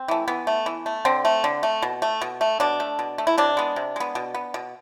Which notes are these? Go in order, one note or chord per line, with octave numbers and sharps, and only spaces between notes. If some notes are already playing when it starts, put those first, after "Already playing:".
Already playing: C4
E3 A3
E3 B3
A3
E3
A3
D3 C4
A3
D3
A3
B2
A3
B2
A3
B2 D4
A3
B2
A3
E4
C3 D4
G#3 B3
C3
G#3 B3
B2
B3
B2